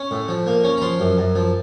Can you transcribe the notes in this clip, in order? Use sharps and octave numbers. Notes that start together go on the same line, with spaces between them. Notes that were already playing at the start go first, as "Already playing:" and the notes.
Already playing: C#4
A2
F3
A#3
C#4
A#5
F3 C6
F#2
F#2
F3